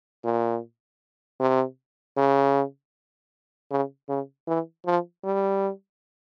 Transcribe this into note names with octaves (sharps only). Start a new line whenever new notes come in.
A#2
C3
C#3
C#3
C#3
E3
F3
G3